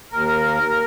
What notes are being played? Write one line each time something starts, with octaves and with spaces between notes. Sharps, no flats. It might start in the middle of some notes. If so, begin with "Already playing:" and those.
D#2 A#4